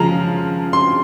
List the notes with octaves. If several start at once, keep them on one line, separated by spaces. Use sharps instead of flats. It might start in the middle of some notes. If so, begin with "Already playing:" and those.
Already playing: C#3 F3 G#3 A5 A#5
C6